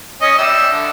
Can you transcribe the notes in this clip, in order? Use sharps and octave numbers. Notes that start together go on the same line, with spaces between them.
C#4 D#5
G3 E5
D3